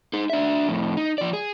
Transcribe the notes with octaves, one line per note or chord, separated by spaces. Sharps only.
D#4 G#4
D4 E5
F2 A2
D#4
F3 D5
G#4